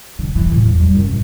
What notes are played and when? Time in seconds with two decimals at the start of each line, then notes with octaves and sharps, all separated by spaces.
0.19 D3
0.36 E3
0.52 A2
0.64 E2
0.80 G3
0.94 F#2
1.10 A1